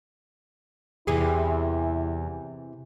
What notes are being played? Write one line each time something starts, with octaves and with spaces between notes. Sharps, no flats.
E2 C3 E3 E4 G#4